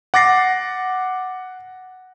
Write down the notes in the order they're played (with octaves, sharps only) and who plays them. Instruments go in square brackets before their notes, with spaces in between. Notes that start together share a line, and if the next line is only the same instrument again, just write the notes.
[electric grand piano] F#5 D6 A6 A#6 C7